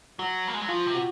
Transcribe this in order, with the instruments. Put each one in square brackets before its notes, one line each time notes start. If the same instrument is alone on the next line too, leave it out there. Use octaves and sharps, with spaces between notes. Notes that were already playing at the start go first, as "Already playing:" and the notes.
[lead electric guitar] F#3 [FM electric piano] F#4
[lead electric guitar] A#3
G#3
F#3
[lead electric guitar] F3 [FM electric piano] F4
[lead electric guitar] C3
[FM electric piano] F#4